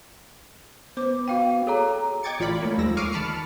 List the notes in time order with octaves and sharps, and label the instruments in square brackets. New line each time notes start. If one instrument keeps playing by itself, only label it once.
[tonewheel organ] B3 [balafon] C5 D6
[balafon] F#4 F5 G5
[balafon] G#4 [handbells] A4 C#5 A#5
[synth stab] D#5 G5 D6 G#6 A6 C#7
A1 F4 D5 B5
A3 A#3 C#5
D#2 F3 G#3 E6 A#6
C#6 D6 F6 C7 D7 D#7
D#3 A5 B5 F6 C#7